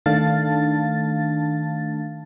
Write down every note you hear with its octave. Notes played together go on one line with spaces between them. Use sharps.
D#3 A3 D4 F5 A5 A6